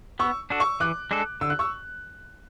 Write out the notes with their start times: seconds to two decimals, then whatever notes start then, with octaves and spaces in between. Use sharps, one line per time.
0.19 B3 C#6 E6
0.50 D4 F#4 A4
0.60 C#6 E6
0.80 E3 D6 F#6
1.11 G#3 D4 A4
1.41 D3 E6
1.50 F#6
1.59 C#6 E6